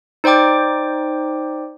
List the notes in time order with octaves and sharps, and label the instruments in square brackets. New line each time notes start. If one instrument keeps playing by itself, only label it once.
[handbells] D#4 C5 D5 G5 D6